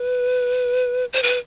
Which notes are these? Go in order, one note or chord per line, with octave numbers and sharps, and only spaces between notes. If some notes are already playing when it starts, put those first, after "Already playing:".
Already playing: B4
C5
B4